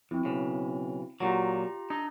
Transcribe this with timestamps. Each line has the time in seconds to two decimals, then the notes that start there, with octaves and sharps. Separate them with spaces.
0.11 F2 C4 E4
0.25 B1 C#3
1.20 A#2 F#3 F4 G4 A#5
1.90 D4 D#4